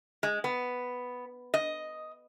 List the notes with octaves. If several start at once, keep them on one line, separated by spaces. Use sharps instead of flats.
G#3
B3
D#5